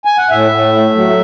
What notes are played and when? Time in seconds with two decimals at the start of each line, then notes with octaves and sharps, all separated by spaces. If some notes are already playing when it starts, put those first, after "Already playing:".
0.05 G#5
0.18 F#5
0.30 A2 E5
0.51 A2
0.73 A3
0.95 F#3